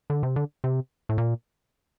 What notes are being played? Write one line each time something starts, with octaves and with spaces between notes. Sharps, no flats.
D3
C3
D3
C3
A2
A#2